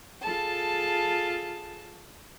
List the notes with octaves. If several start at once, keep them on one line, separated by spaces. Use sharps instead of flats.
F4 G#4 A4 A5